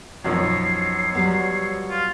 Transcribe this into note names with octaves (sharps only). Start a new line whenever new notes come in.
B1 F#2 F3 B3 D#4 C#5 C7
F#3 G3 B3
F4